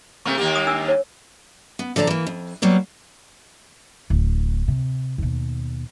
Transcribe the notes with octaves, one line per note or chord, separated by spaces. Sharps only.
C3 A3 A#3 C#6
D#2 A#3 G4
D#6
D4 E6
C#5
B3
D3 F3 A4 D5 A#5
E3 A#3
F2
F#3 G3 A#3 B3
D1
C3
D#2 B2